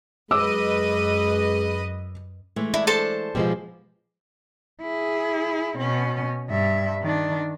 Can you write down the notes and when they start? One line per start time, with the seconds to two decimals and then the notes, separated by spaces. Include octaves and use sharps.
0.31 F#2 G#3 B4 D#5 D6 E6
2.56 E3 G#3 A3
2.74 D4 E4
2.87 A4 C5 A5
3.35 B2 F3 G#3 G4
4.82 E4 G#4
5.78 B2 C#4
6.49 G2 E5
7.02 D#3 D4